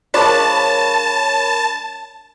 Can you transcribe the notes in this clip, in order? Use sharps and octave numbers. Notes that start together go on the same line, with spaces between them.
F3 G#3 D4 A#4 C#5 A5 B5